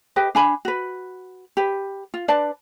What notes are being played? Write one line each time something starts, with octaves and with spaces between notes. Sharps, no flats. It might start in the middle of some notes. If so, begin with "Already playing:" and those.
G4 B4 D#5
D4 G#5 B5
F#4 B4
G4 B4
F4
D4 B4 D5 A5